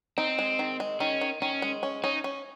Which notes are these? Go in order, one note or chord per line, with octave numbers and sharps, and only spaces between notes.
C4 D#4
G#3
D#3
G#3
D#3 C#4
D#3
D#3 C#4
G#3
C#4
C#4 D#4
C#4